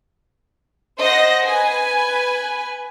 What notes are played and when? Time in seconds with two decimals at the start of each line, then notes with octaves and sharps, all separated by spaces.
0.99 C5 D#5 F#5 A#6
1.46 B4 G#5